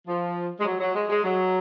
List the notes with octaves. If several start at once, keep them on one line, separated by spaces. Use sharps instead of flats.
F3
G#3
F#3
F#3
G#3
G#3
F#3